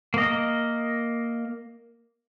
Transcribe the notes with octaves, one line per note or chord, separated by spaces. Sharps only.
A#3 D#5